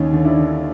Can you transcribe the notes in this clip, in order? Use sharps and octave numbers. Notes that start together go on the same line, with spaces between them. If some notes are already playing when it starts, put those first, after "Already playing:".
Already playing: D#2 C#4 D#4
D3
D4 E4
D3